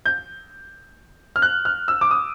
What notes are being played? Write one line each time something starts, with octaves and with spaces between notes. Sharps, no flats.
G6
F6
F#6
F6
E6
D6
D#6